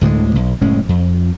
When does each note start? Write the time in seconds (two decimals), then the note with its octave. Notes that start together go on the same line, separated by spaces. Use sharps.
0.01 D2 A2 D3 G#3
0.35 B1
0.61 F#1 A2 G#3 C#4
0.89 F2